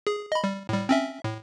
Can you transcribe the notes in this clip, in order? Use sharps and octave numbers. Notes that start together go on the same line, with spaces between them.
G#4
D#5 B5
G3
A2 G3
C4 C#4 E5
A2